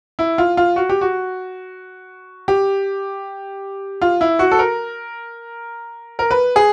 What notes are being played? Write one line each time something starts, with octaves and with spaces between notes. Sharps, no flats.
E4
F4
F4
F#4
G4
F#4
G4
F4
E4
F#4
A4
A#4
A#4
B4
G#4